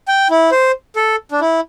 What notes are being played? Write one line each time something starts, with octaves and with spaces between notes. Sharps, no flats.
G5
E4
C5
A4
D4
E4